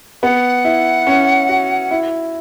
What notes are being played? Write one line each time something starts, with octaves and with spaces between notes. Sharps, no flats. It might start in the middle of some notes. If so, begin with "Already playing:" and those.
B3 F#5
E4
C#4
F#4
E4